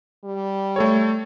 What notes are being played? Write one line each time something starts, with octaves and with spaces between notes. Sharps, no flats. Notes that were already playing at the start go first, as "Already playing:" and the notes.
G3
A3 A4 C#5